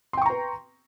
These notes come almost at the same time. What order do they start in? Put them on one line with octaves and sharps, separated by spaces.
C6 G5 C#6 A#5 B4